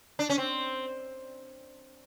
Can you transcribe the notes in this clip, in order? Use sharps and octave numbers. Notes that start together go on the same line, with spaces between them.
D4
C#4
C4